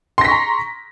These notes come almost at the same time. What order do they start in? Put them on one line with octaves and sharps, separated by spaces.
C6 A#6 B6 C#6 A#5